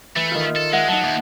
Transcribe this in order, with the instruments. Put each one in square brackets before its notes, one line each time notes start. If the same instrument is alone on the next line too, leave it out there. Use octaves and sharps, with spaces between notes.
[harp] E3 [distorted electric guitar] A3
[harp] D#3 F4
[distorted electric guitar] A4
[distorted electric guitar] G#3 [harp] E5 F#5
[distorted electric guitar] F#3 [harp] D#4 A5
[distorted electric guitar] D#2